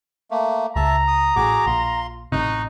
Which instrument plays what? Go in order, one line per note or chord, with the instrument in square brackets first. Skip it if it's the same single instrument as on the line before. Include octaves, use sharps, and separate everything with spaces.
[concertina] A3 A#3
[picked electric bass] C#2 [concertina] E5 A5 [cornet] A#5
[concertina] D#6
[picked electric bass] A1 [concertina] F#4 G#4 D6
[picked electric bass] A#1 [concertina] F4 C6
[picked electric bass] A1 C3 [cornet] D#4 [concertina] C#6 F#6